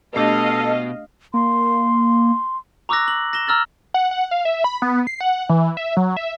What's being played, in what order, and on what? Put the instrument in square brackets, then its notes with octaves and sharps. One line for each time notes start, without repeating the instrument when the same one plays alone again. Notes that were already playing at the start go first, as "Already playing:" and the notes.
[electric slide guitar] B2 [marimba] A3 D4 G4 [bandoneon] A4 [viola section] D#5 F5
[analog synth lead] A#3 [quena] C6
[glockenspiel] A#5 C#6 D6 E6 F#6 A#6
F#7
A#6 E7 G7
A#5 E6 F6 A6 F#7
[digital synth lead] F#5
F#5
F5
E5
B5
B3
C7
F#5
E3
E5
F#3
E5